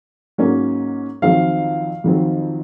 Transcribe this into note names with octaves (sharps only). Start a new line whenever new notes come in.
G#2 F#3 A#3 C#4
F2 D#3 F#3 C4 F5
F2 D#3 F#3 C4